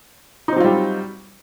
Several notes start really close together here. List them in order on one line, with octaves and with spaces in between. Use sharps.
D#4 C4 F#3 F4 G3